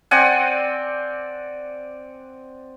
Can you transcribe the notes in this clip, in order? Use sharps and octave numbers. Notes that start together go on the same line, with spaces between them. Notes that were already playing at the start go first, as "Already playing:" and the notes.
C4 D5 F#5 G#5